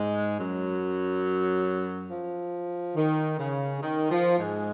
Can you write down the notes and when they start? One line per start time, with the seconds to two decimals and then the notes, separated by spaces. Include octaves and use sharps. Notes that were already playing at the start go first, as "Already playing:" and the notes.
Already playing: G#2 G#3
0.38 F#2 F#3
2.09 F3
2.96 D#3
3.38 C#3
3.81 D#3
4.10 F3
4.38 G#2 G#3